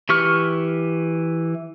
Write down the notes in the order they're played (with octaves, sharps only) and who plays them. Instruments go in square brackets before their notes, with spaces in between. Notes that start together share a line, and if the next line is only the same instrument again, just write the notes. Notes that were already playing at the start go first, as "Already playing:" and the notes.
[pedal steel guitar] E3 G4 C#6 F6